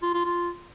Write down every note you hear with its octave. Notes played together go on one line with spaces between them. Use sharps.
F4
F4
F4